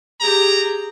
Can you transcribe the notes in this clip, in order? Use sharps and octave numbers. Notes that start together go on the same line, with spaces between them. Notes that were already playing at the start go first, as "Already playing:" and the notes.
G4 G#4 A#5